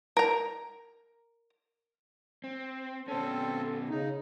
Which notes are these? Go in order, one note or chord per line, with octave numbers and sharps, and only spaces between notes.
A#4 A#5
C4
B2 C4 C#4 A4
C#3 D#4